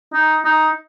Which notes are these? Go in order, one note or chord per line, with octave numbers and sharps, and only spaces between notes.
D#4
D#4